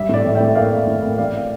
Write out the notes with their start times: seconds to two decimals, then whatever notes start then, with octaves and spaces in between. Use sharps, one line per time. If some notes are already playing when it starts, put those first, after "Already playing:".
Already playing: G3 E5
0.09 A2 D5
0.25 A1
0.35 A2 E5 G5
0.55 A#3 D5 F5
0.71 A#3
0.87 A2
1.03 A#3
1.18 A1 D5 F5